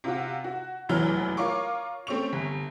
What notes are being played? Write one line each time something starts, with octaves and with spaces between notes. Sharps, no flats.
C3 F4 F#4
F#4
F1 A#1 F#2 E3 F#3 F6
F4 A#4 C#5 F5 C#6 D6
A3 C4 C#4 C#6 F7
G1